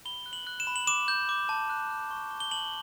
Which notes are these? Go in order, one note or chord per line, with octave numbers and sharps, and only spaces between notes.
B5 G7
F#6
F#7
F#6
E7
B5
F#7
D6 E7
G6
D6
A5
F#6
F#6
C#6
C#6
G7
A5 F#7